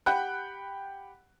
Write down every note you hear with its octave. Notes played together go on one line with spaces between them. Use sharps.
G4 F#5 G5 B5 F#6